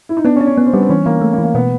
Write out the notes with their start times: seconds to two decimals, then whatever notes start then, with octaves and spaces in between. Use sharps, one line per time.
0.09 E4
0.17 D#4
0.25 B3 D4
0.36 C#4
0.41 D4
0.47 C#4
0.57 B3 C#4
0.66 C4
0.73 G3 B3
0.82 C4
0.90 E3 C#4
1.06 E3 A#3
1.22 A3
1.33 A#3
1.38 E3
1.44 A#3
1.54 B2 B3